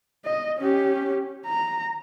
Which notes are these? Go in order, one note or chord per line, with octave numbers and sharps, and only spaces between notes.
D#5
C#4 G4
A#5